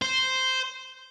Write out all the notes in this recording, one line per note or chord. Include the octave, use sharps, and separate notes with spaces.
C5